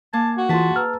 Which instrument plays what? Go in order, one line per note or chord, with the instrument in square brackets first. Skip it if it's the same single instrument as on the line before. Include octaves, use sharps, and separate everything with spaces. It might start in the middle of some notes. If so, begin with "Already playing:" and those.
[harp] A#3 [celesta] G#5 D6 G#6 [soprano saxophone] A5
[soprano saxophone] F#4
[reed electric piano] E3 F4 [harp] G#4 A5 [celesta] C6 B6
[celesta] B4 A#5 E6 [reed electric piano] F6